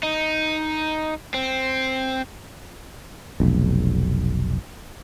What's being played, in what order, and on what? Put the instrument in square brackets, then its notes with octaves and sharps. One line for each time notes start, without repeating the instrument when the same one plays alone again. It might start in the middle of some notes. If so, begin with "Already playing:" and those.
[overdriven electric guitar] D#4
C4
[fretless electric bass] F1 B1